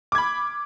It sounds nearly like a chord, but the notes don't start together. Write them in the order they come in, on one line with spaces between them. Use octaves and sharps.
D6 G#6 B5